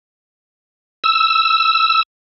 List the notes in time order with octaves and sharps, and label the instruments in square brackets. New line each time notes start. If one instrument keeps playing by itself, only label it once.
[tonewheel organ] E6